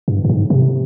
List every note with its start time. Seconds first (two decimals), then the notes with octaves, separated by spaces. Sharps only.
0.08 G2
0.25 G2
0.29 G#2
0.50 C3